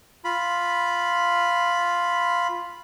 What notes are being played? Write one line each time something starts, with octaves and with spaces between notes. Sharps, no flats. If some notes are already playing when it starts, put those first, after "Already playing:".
F4 B5